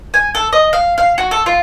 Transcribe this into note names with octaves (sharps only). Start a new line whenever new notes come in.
G#5
A4
D#5
F5
F5
F#4
A4
F4